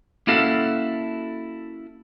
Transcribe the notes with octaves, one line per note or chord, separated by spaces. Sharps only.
A#3 C#4 E4 F#4 A4 F5